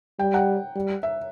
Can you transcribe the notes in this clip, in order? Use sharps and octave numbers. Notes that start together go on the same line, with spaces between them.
G3 G5
F#5
G3
E5